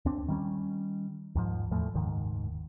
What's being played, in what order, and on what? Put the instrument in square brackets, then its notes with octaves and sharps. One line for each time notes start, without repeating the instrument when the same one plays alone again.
[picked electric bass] D#2 C4 D4
D#3 G3 C#4
D#2 G#2 F3
E2 A2 F3 A3
F#1 D#2 G#2 D#3